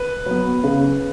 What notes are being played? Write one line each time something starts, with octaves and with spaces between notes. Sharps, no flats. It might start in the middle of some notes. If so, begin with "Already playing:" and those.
Already playing: B4
F#3 B3
C#3